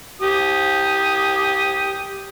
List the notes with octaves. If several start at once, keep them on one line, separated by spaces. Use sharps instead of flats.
G4 D#6